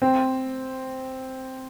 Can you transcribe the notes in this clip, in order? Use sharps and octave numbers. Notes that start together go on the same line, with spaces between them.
C4